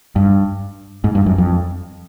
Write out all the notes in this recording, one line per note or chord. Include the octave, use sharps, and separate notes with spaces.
G2
G#2
G2
F#2
F2